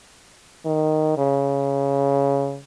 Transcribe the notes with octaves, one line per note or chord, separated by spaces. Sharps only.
D#3
C#3